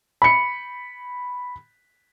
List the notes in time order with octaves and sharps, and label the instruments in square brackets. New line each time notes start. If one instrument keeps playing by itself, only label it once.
[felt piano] B5 C#7